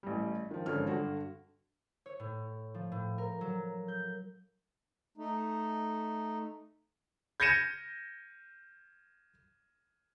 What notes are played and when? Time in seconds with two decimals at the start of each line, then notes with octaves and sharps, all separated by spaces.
0.03 A1 G3
0.51 D#3 F3
0.66 G#1 D3 F3 C#4 F6
0.87 G2 D3 F#4
2.06 C#5
2.20 A2
2.74 F3
2.92 A2
3.18 A#4
3.41 F#3
3.88 G6
5.18 A3 D#4
7.40 G6 G#6 A#6 C#7 D#7 E7